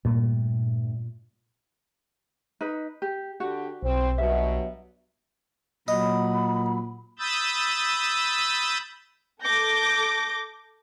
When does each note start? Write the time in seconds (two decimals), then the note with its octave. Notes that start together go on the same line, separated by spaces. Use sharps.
0.05 G2 A#2 G3 A3
2.61 D#4 B4
3.02 G4
3.40 D3 F#4 G4
3.83 B1 C4
4.18 G2 B2 F#3 E5
5.88 A#2 F#3 D#5 B5
7.19 B5 D#6 E6 G6 A6
9.43 A4 D6 G6 A#6